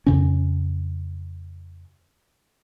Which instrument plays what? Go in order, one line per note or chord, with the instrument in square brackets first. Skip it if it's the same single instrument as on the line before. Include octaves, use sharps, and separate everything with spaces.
[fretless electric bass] F2 C#3 C#4